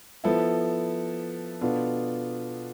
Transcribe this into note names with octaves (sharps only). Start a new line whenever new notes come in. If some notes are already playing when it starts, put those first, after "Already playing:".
F3 B3 E4 A4
B2 B3 D4 F4 A4